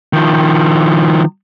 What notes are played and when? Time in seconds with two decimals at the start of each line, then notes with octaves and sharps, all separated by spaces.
0.13 D#3 F3